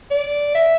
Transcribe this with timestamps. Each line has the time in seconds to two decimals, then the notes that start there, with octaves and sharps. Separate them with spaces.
0.11 D5
0.55 E5